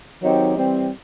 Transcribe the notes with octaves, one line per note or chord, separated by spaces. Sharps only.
D#3 F#3 C4 D#4 G4
E3 G3 C4